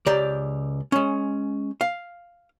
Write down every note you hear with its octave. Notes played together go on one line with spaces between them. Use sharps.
C#2 G4 D5 A#5
G#3 C#4
F5